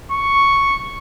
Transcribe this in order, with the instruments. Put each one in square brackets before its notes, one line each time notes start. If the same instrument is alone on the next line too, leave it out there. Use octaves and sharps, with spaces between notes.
[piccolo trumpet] C#6